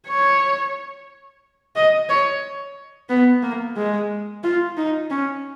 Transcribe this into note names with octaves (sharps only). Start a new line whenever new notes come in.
C#5
D#5
C#5
B3
A#3
G#3
F4
D#4
C#4